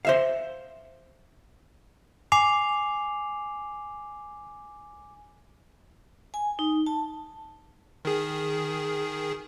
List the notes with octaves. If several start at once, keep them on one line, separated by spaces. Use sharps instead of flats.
C5 E5 F5
G#5 D6 C7 F7
G#5
D#4
A5
D#3 G#4